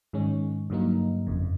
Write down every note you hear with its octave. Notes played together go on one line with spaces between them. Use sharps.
G#2 D#3 G#3 C#4
G2 D3 F#3 A#3 D#4
G1 F2 C#3